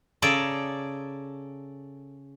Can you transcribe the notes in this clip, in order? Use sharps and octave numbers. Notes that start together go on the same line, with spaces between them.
C#3 G#4 A4 D5 A#5